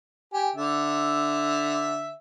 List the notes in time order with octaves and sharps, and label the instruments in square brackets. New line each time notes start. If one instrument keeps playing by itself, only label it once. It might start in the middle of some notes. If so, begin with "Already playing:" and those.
[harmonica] G4 G#5
D3 E5